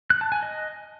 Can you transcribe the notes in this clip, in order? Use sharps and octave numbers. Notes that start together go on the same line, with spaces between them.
F#6
A5
G#5
D#5